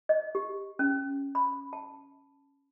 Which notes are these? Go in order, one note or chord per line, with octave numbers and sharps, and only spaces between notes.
D#5
G4
C#4
B5
A5